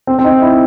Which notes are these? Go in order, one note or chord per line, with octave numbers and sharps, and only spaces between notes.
C4
C4
D#4
E4